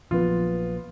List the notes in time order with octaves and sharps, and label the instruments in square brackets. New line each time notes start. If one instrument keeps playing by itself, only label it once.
[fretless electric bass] A#1 F3 F#3 [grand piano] B3 F4